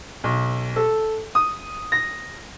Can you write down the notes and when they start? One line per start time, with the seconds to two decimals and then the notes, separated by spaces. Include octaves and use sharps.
0.24 B1
0.76 A4
1.35 D#6
1.92 A#6